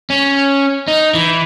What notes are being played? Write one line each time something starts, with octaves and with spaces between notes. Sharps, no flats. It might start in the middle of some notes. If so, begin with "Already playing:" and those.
C#4
D#4
E3